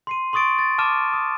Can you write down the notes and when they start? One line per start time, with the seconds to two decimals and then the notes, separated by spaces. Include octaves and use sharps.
0.07 C6 C7 D#7
0.33 C6 C#6 D#6 A6 D7
0.59 A6
0.78 A5 D6 F6 D#7 E7
1.13 D#6